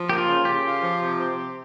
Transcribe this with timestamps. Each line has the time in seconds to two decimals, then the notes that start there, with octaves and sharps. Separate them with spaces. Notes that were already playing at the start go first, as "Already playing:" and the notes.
Already playing: F3
0.08 A#3 G4
0.18 F4
0.27 C#3
0.45 C#3 G4
0.64 F4
0.82 F3
1.00 C3
1.19 C4
1.37 C3